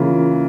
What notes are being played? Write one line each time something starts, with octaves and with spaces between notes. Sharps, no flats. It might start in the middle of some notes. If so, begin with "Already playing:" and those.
Already playing: C#3 E3 A#3 F4